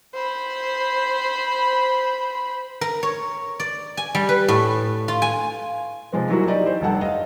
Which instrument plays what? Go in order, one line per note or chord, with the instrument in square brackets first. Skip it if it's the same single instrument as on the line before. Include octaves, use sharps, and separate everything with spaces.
[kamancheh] C5 B5
[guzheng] A#4
C#5
D5
G#5
G3
B4
A2
F4
G#5
[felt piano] C3 F3 G#3 B3
E3 F#3 G3 A#3 E4 F#4
D#4 G4 D5 D#5
C5
F1 G2 A4 F#5 A5
D#5 F5